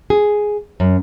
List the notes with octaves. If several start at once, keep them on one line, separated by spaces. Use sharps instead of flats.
G#4
F#2